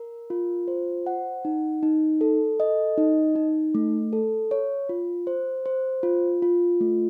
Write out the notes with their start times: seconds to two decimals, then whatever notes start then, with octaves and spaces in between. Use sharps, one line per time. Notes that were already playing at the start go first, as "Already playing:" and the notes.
Already playing: A#4
0.30 F4
0.68 C5
1.07 F#5
1.45 D#4
1.83 D#4
2.21 A4
2.60 D#5
2.98 D#4
3.36 D#4
3.75 A3
4.13 A4
4.51 C#5
4.89 F4
5.27 C5
5.66 C5
6.03 F4
6.42 F4
6.81 A3